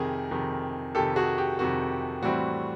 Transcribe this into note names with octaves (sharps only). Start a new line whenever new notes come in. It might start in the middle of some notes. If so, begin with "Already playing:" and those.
Already playing: F2 C3 D#3 G#4 A#4
F2 C3 D#3
F2 C3 D#3 G4 A4
F#4 G#4
G4
F2 C3 D#3 F#4
A2 E3 G3 C4 F#4